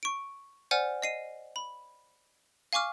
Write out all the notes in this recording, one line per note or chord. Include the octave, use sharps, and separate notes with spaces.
C#6 D7
C5 D5 F#5 G#5 F6
D#5 C7 D#7
B5
F5 G#5 C#6 D6 F6